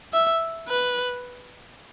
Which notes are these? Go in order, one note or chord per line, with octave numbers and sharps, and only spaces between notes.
E5
B4